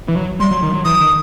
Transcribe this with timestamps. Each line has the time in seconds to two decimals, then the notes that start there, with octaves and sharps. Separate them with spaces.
0.08 E3
0.16 F#3
0.40 G3 C6
0.51 F#3
0.62 D#3
0.73 F#3
0.85 E3 D#6
1.01 D#3